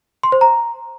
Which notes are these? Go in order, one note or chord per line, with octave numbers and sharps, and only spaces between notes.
C6
C5
A#5